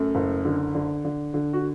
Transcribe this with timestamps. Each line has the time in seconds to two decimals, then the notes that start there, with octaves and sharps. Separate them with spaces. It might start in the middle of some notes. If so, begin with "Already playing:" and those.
Already playing: F#2 A3
0.15 F#1
0.45 D3
0.75 D3
1.05 D3
1.34 D3
1.53 F#4